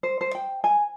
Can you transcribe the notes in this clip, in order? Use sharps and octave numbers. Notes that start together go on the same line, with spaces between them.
C5
C5
G5
G#5